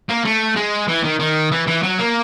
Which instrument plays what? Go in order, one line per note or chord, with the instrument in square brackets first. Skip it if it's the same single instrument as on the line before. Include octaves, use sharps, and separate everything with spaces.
[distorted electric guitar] A#3
A3
G#3
E3
D#3
D#3
E3
E3
F#3
A#3